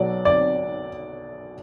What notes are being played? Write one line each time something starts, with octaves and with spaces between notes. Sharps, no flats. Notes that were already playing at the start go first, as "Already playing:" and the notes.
Already playing: B1 B2 F#3 D5
D5